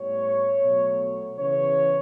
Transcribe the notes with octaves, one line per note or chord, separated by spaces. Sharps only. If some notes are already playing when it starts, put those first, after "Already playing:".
Already playing: A2 G3 B3 C#5
B2 F#3 A3
C#3 E3 B3 C#5